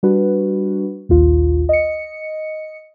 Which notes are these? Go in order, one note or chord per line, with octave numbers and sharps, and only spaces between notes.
G3 D4 F#4 B4
A#1 D#2 F4
D#5 C#7